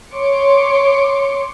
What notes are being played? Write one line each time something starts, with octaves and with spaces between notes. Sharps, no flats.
C#5 C6 D6 C#7